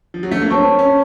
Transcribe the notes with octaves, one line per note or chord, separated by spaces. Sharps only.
F3
F#3
A3
A#3
C4 C#5 A5 C#6
C#4